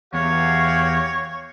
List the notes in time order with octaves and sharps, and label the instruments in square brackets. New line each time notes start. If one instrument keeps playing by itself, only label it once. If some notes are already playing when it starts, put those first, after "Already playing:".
[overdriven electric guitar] E2 [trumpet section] F#4 G4 F5 [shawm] C#5